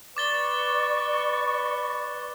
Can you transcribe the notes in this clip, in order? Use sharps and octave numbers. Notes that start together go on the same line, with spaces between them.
B4 D5 C#6 D6 A6 G7